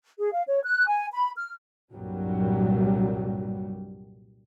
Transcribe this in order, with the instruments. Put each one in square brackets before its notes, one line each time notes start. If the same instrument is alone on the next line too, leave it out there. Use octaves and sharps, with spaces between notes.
[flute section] G#4
F5
C#5
F#6
G#5
B5
F6
[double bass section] C2 G2 A#2 F#3 G3